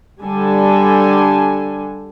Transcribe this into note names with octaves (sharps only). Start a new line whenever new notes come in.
D3 G3 D4 A4 G#5